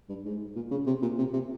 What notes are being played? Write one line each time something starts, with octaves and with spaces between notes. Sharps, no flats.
G2
G#2
A#2
C#3
C3
A#2
C3
C3